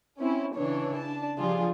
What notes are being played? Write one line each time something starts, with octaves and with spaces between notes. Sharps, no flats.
C4 C#4 E4
C#3 E3 D4 C#5
D4 A5
C#3 F3 G3 D4 F4 G#4